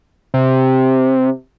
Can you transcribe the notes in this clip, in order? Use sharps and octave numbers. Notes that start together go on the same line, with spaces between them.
C3